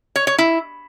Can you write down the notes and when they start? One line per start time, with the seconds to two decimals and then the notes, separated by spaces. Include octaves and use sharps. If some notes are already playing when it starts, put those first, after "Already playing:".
0.16 C#5
0.27 C#5
0.38 E4